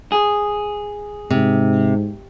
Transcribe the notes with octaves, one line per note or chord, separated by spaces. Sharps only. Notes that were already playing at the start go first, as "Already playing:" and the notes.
G#4
G#2 C3